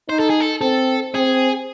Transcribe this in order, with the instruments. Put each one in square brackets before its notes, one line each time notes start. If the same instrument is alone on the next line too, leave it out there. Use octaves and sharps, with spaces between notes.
[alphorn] D#4 [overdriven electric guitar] C5
[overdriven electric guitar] A4
G#4
A4
[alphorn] C4 [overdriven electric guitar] A4
[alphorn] C4 [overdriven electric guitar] G#4